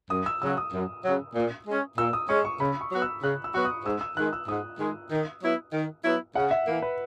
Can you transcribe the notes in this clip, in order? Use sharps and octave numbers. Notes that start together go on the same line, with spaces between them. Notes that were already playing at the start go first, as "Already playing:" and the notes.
F#2 D#6
E6
C#3 F#3 E6
D#6
F#2
C#3 F#3
A#2
G#3 C#4
A#2 E6
D#6
G#3 C#4 C#6
C#6
C#3 B5
C#6
F#3 B3 F#4
E6
C#3 F#6
E6
F#3 B3 F#4 C#6
D#6
G#2 E6
E6
D#3 G#3 F#6
E6
G#2 D#6
D#3 G#3
D#3
F#3 B3 E4
D#3
F#3 B3 E4
C#3 F#5
E5
E3 A#3
B4